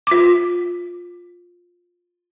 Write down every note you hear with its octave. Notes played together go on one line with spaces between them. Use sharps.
F4 D6